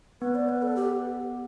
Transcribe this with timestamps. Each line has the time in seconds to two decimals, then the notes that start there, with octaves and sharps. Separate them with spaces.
0.21 B3 B4
0.35 D5
0.49 B4
0.62 A4
0.76 G4